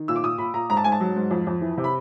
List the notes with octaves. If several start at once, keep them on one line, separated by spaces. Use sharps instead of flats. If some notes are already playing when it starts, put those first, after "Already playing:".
Already playing: D#3
A#2 E6
D6
A#2 D#6
A#2 B5
A#2 A#5
G#2 A#5
A5
G#2 G#5
A5
F#3
G#2
F2
F2
E3
C3
B5